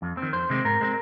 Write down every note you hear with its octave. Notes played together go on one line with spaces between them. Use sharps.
F2
C4
D#3
F2 C5
C3 D#3 G#3 C4
G#2 A#4
G#3 C4